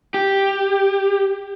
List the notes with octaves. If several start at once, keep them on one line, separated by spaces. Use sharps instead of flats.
G4